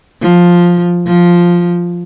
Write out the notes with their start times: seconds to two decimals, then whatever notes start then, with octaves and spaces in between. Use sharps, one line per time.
0.22 F3
1.06 F3